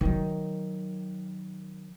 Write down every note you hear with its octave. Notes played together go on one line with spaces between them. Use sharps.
D#3 F#3